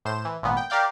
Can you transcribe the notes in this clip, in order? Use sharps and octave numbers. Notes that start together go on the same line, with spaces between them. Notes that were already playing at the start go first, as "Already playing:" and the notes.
A2 C5 E7
E3
G#1 A#2 B3
G5
G4 A#4 D5 F5 G5